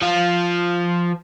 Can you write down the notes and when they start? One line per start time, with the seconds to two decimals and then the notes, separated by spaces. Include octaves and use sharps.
0.01 F3 F4